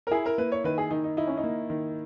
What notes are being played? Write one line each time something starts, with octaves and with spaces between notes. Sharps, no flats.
A#4
E4 G#4
A#4
A#3 B4
C#5
D#3 B4
G#4
D#3 D#4
D#4
D#4 E4
C#4
D#4
A#3
D#3